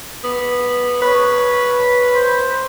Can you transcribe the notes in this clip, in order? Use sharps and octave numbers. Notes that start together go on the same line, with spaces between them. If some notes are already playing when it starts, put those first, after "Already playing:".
B3
B4 C#5
C5